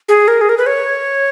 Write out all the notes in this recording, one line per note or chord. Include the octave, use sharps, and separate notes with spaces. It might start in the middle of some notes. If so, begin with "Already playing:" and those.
G#4
A#4
G#4
A#4
B4
C#5